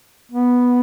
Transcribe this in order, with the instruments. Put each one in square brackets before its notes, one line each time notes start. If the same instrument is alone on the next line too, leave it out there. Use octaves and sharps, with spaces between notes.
[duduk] B3